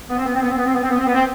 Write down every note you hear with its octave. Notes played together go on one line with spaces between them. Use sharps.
B3
C4
B3
C4
B3
C4
B3
C4
B3
C4
B3
C4
B3
C4